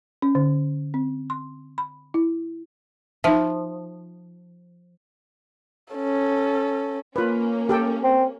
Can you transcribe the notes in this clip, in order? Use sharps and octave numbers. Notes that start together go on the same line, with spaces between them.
C#4
D3
C4
C6
B5
E4
F3 D#4 E5
C#4 A4
A#3 C#4 F4 B4
G4 A4 G5
C4